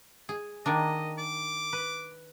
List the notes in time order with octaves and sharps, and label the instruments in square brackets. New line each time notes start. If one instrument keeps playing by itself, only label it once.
[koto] G#4
[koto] D#3 A#3 D4 [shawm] D#5
[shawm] D6
[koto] B4